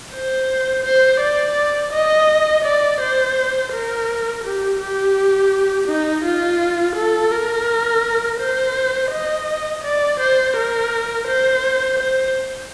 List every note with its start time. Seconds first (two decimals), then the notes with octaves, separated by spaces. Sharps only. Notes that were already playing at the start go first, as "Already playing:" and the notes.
0.13 C5
0.84 C5
1.20 D5
1.92 D#5
2.64 D5
3.00 C5
3.72 A#4
4.44 G4
4.80 G4
5.88 D#4
6.24 F4
6.96 A4
7.32 A#4
8.40 C5
9.12 D#5
9.84 D5
10.20 C5
10.56 A#4
11.28 C5
11.99 C5